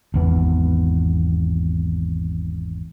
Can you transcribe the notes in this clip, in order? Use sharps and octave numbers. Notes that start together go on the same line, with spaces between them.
G#1 E2 B3